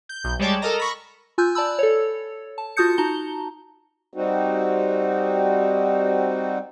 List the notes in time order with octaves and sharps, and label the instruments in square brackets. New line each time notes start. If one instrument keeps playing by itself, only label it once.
[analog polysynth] G6
B1 G6
G3 G#3 C#5 D5 G5 A5
A4 A#4 D#5 A#5
B5 C#6 A#6
[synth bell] F4 G#5 E6 F#6 G6
D5 A5 B5 E6
A4 C#5
A5
F4 F#4 A5 D#6 G6 C#7
D#4 F#4 A5 A#5 G7
[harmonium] G3 C4 D#4 F#4